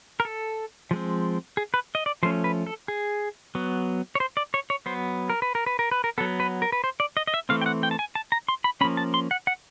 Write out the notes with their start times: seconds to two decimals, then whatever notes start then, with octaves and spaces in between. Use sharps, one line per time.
0.20 A#4
0.25 A4
0.91 F3 G#3 C4
1.57 G#4
1.74 B4
1.95 D#5
2.06 D5
2.23 F3 A3 C#4 C5
2.44 B4
2.67 A4
2.88 G#4
3.55 F#3 B3
4.15 C#5
4.20 C5
4.37 D5
4.54 C#5
4.70 C#5
4.86 F#3 B3 C5
5.30 A#4
5.42 B4
5.55 A#4
5.66 B4
5.79 A#4
5.91 B4
6.04 A#4
6.18 B3 A4
6.20 F#3
6.40 B4
6.62 A#4
6.72 B4
6.84 C5
7.00 D5
7.17 D#5
7.27 D#5
7.34 E5
7.49 E3 A3 C4 F5
7.61 G5
7.66 F#5
7.83 G5
7.91 A5
7.99 G#5
8.15 A5
8.32 A#5
8.48 C6
8.64 B5
8.81 F3 A#3 C#4 B5
8.97 A5
9.14 C6
9.31 F#5
9.47 F#5